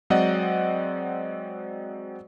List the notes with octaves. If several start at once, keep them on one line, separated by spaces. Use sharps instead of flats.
F#3 G#3 C4 D5 D#5 F#5